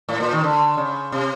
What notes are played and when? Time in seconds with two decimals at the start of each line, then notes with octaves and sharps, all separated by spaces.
0.09 A2
0.20 A#2
0.33 D#3
0.44 D3
0.77 C#3
1.12 C3